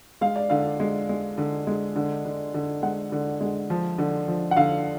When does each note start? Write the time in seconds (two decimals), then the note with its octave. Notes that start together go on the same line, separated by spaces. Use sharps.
0.21 G#3 F5
0.36 D5
0.50 D3 F5
0.80 G#3
1.09 G#3
1.38 D3
1.67 G#3
1.96 D3
2.25 D3
2.54 D3
2.82 G#3 F#5
3.12 D3
3.41 G#3
3.70 F3
3.98 D3
4.28 F3
4.51 F#5
4.57 D3 F5